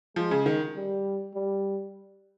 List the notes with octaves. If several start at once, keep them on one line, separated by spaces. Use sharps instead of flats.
F3 G#3
C#3
D#3
G3
G3